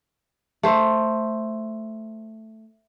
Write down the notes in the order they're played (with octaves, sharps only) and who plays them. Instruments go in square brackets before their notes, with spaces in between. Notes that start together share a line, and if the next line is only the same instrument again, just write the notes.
[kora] A3 C5